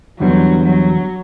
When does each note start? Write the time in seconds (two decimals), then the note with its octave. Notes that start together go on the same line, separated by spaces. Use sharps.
0.20 E2 D3 F#3 G3 B3
0.65 F#3